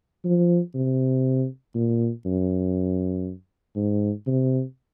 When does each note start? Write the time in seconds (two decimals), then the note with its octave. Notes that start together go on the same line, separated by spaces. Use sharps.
0.24 F3
0.75 C3
1.75 A#2
2.25 F#2
3.76 G#2
4.27 C3